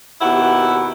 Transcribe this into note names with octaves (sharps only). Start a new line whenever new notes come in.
D#2 B2 E4 G4 F#5